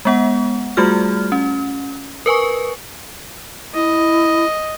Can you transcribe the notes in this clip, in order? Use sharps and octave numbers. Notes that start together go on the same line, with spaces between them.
G#3 B3 F#5
G3 A3 F4 F#4 G#4 F6
C#4
A#4 B4 G#5 C#6
E4 D#5